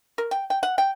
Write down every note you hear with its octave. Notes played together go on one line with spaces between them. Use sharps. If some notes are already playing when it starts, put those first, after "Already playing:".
A#4
G5
G5
F#5
G5